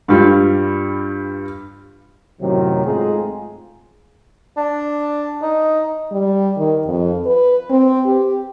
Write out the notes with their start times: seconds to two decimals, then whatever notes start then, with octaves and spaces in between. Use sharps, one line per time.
0.08 G2 G3 F4
2.42 F#2 A2 C3 D#3 F#3
2.85 G#2 A3 C4 D#4 F4 G#4
4.57 D4
5.42 D#4
6.12 G3
6.57 D#3
6.87 F2
7.26 B4
7.70 C4
8.05 G4